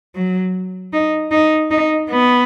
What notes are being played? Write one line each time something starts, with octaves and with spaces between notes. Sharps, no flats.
F#3
D#4
D#4
D#4
B3